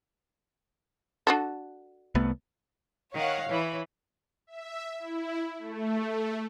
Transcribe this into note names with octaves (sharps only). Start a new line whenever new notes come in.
D4 F#4 A4
C2 A3 B3
D#3 C#5 F5 F#5
E3 C#5 B5
E5
E4
A3